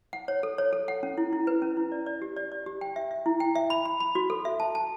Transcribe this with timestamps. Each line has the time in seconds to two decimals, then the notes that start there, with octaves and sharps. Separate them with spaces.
0.13 F#5
0.28 C#5
0.43 A4
0.58 C#5
0.73 A4
0.88 F#5
1.03 C#4
1.18 E4
1.33 E4
1.47 B4
1.62 C#4
1.77 E4
1.92 D5
2.06 D5
2.22 G4
2.37 D5
2.52 D5
2.66 G4
2.81 G5
2.96 E5
3.11 E5
3.26 E4
3.40 G5
3.56 E5
3.70 B5
3.85 B5
4.00 B5
4.15 F#4
4.30 A4
4.45 E5
4.60 A5
4.75 A5